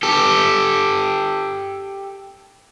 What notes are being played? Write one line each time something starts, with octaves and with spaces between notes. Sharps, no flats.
G4 A4